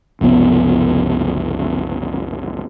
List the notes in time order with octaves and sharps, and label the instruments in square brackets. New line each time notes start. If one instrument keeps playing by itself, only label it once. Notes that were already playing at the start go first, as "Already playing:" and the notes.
[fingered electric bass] F#1 C2 F3 B3